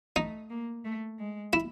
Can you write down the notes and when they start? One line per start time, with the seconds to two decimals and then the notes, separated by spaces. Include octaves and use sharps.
0.16 A3 D#4
0.50 A#3
0.84 A3
1.19 G#3
1.53 E4